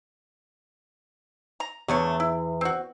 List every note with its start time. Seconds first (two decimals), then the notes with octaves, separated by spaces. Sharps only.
1.60 A#5
1.88 E2 D3 A3 C#5
2.20 E4
2.61 C4 F#4